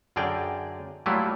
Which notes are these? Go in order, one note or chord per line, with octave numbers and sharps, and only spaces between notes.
F#2 D3 G#4 A#4 D5 G5
F#3 G3 A3 A#3 E4 F4